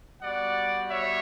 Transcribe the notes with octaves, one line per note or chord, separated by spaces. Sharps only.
G3 B3 F#4 D5 F#5
C#5 E5